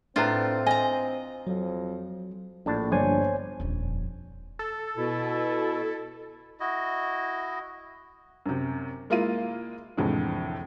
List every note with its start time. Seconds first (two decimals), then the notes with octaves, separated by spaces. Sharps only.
0.16 A2 C4 D4 F4 B4 A#5
0.66 D#5 G#5 A#5
1.47 F2 F#3
2.66 A#1 A2 D4 A5
2.92 G1 D4 C5 C#5 G#5
3.60 D#1 F2
4.59 A4
4.97 B2 E4
6.60 E4 F#4 D#5
8.46 F#2 C3
9.10 G#3 A#3 E4 F4 F5 D#7
9.97 C2 F2 A2 D3 E3 G#3